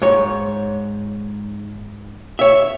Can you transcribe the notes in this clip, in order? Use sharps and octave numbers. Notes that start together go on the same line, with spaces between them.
G#2 C#5
C#5 E5